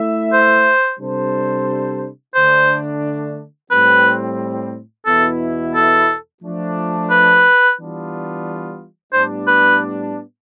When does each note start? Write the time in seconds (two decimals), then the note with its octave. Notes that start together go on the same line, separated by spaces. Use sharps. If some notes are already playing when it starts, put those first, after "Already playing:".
Already playing: A3 E4 A4 E5
0.33 C5
0.99 C3 G3 D4 A4 C5
2.35 D3 A3 D4 C5
3.71 A2 G3 C4 B4
5.06 E2 B2 B3 E4 A4
5.75 A4
6.42 F3 A3 D4
7.10 B4
7.77 E3 G3 B3 D4 F4
9.13 A2 G3 B3 D4 C5
9.47 B4